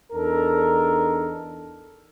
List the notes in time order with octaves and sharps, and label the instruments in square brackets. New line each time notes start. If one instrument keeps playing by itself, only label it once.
[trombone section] E2 D4 D#4 A4 A#4